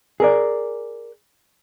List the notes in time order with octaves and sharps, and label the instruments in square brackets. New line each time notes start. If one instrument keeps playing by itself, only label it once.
[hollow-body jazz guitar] G#4 A#4 D5